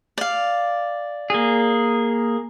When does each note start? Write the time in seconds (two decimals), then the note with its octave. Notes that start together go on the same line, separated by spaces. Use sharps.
0.18 D5 F5
1.30 A#3 G#4